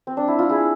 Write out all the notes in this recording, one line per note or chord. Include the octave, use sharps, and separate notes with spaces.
C4
D4
E4
F4
E4 G#4